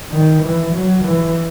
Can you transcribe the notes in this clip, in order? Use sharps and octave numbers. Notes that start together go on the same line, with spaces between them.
D#3
E3
F#3
E3